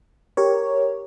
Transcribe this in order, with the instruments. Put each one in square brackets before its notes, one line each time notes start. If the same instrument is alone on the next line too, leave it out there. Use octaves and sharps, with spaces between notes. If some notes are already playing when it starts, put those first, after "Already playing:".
[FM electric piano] G4 A#4 C#5